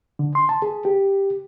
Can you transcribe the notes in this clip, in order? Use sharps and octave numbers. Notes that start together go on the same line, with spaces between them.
D3
C6
A5
G#4
G4